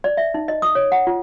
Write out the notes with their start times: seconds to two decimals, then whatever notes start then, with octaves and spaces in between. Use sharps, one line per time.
0.04 D5
0.17 E5
0.34 D#4
0.48 D#5
0.62 D#6
0.75 C#5
0.92 F#5
1.07 F4